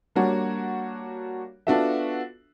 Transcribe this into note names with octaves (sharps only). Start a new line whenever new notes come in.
G3 A#3 D4 F#4 C#5
B3 D4 F4 F#4 A4 E5